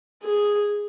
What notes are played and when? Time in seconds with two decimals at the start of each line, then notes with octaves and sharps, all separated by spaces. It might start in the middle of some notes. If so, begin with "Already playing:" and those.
0.23 G#4